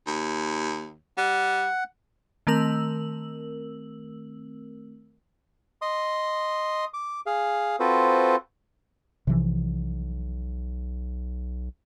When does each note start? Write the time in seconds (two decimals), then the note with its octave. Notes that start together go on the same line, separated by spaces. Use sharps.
0.07 D#2
1.18 G3 F#5
2.47 D#3 A3 C4 A#4 E6 F#7
5.82 D#5 C6 D#6
6.94 D6
7.26 G#4 F5
7.80 C4 F4 F#4 A4 B4 C5
9.27 B1 C3 E3 F3